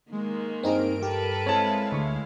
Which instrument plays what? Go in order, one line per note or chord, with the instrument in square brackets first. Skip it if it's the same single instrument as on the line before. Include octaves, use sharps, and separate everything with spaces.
[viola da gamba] D#3 A#3 [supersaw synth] G#3
[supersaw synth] G2 A#4 D7 [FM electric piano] C4 D#4 G#4
[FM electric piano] G4 [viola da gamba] A4 B4
[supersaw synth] G#3 E4 F5 [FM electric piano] C4 [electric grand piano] C#5 A5
[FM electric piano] D2 C#6